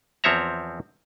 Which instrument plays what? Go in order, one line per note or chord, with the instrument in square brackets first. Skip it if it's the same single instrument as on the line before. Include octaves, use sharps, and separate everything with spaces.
[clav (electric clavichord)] E2 F3 C4 C#5 E5 A#5